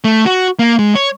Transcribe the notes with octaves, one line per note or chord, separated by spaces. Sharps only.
A3
F#4
A#3
G#3
C#5